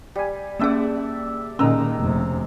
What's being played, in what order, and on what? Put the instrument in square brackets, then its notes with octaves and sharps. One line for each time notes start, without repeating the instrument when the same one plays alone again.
[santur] G3 G#5
[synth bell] A#3 C#4 G#4 [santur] D5 E5 A5
[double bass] A#2 D#3 [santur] G#3 A#5 E6 [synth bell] C#4
[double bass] F1 C3